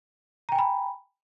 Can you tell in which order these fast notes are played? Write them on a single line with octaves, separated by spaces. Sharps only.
A#5 G5 G#5 B5